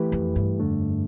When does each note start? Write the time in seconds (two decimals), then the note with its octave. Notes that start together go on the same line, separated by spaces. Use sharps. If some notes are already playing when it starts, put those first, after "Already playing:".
Already playing: E3 A3 E4 G4 B4
0.12 F2
0.36 G2
0.60 F2 D3 A3 D4